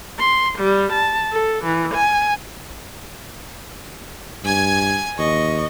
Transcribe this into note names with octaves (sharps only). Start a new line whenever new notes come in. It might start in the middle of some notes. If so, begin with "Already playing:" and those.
C6
G3
A5
A4
E3
G#5
G2 G#5 G#6
D#2 D#5 C#6